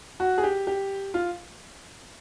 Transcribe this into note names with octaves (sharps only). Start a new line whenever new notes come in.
F#4
G#4
G4
G4
F4